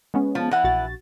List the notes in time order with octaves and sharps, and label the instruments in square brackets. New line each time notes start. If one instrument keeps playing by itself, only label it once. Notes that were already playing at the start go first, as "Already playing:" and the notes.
[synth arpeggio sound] G#3 B3 C#4
[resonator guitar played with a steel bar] F3
E3 F#5
[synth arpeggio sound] A#1 F#4 A6